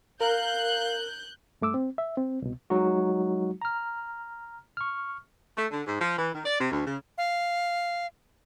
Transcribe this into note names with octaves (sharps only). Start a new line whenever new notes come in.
A#4 F5 F#6 G6
G2 A3 D6 E6
C4
E5
C4
C2 B2
F#3 G#3 D#4 F#4
A#5 F6
C#6 F6
A3
D3
G#2
F3
E3
D#3
D5
C3
D2
C#3
F5